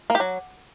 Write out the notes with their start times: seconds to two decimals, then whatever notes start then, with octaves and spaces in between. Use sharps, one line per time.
0.10 A#3
0.15 G4
0.20 F#3